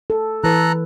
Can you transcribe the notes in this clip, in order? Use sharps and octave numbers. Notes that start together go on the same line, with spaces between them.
A4
E3 A4 B4 A#5 F#6